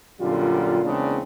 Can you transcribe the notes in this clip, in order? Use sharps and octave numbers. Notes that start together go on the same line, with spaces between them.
F#2 A#2 D3 G3 F4
E2 C#3 G#3 A#3 C4 D4